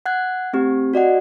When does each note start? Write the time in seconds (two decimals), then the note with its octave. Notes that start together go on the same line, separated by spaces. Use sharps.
0.06 F#5 F#6 G#6
0.53 A3 C4 G4
0.94 F#4 D5 D#5 F#5